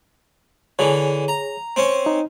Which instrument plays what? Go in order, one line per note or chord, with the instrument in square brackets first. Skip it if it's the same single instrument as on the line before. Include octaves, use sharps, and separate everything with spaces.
[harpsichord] D3 E3 [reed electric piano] G#4 C#5
[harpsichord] A#5
C4 C#4
[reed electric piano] D#4